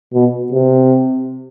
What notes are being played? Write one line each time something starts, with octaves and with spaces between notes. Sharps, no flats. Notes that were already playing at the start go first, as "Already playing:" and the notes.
B2
C3